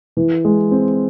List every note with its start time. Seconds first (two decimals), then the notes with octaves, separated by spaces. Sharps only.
0.17 E3
0.45 G#3
0.71 C4